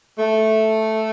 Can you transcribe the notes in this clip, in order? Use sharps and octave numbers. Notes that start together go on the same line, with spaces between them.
A3